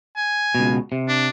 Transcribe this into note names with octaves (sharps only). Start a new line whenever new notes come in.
G#5
C#2 B2
C3
D4